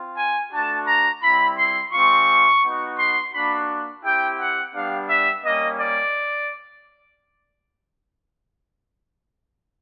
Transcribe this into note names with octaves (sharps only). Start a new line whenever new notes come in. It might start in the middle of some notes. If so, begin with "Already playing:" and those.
Already playing: C4 F4
G#5
A3 D4 F#4 A5
A#5
G3 C4 E4 B5
C6
G#3 C4 F4 C#6
B3 D#4 F#4
C6
A#3 D4 F#4 B5
C4 E4 G4 G5
F#5
G3 B3 D4 G4 F5
E5
G3 A#3 C#4 D#5
D5